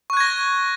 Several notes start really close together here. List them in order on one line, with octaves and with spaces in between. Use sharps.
C#6 F#6 G#6 A#6